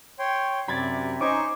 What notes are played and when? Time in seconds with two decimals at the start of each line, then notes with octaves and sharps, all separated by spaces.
0.19 C#5 G5 C6
0.68 F#2 C3 D5 B5 G#6 A6
1.21 C#4 D#4 C5 G#5 C#6 D6